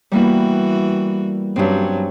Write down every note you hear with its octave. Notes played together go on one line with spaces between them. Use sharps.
E3 G3 A#3 B3 F#4
G2 F#3 C4 C#4